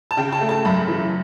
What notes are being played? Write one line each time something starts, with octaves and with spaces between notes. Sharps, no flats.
A5
C#3 G5
A5
A3
A5
F#2 B5
E3